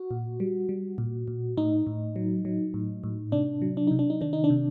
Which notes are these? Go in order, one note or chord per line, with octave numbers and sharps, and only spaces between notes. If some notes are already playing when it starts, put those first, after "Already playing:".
Already playing: F#4
A#2
G3
G3
A#2
A#2
A2 D#4
A2
F#3
F#3
A2
A2
C3 D4
F#3
D4
C3 D#4
D4
D#4
D#3 D4
D#4
D4
C3